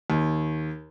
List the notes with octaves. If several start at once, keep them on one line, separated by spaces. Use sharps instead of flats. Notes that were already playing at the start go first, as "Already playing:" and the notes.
D#2